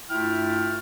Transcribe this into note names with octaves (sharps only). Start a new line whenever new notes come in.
G2 A3 E4 F4 G5 F6